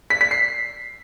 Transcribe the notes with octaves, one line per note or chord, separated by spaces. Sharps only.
B6
B6
C7